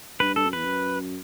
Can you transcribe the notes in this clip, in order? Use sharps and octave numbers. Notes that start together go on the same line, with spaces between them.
G2 B4
G2 A4
F#2
E2 B4
F#2